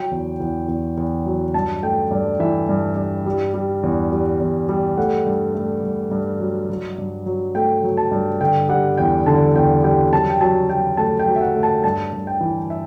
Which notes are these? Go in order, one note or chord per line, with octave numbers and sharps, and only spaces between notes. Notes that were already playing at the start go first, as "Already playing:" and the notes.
Already playing: F#3 G5
E2
E2
E2
E2
F#3
G2 A5
A3 G5
G2 D5
E3 E5
G2
G2
G3
G3
E2
G3
E2
G3
A3 F#5
G2
A3
G2
G2
F#3
F#3
G2
F#3
A3 G5
F#3
A5
G2
D3 G5
G3 F#5
E2 G5
D3 A5
E2 G5
G3 G5
F#2 A5
G5
F#3 A5
F#3 G5
A3 A5
G5
F#3
E5
F#5
A3
A5
G2 A5
G2
G5
E3
E5